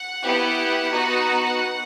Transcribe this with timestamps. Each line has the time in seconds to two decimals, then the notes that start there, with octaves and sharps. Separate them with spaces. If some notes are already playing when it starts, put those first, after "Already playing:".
Already playing: F#5
0.23 B3 E4 G4
0.91 B3 D#4 F#4